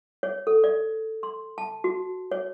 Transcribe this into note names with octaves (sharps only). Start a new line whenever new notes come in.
C#5
A4
D5
C6
A5
F#4
C#5